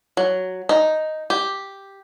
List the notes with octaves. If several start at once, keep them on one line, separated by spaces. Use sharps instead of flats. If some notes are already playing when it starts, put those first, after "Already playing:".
F#3
D#4
G4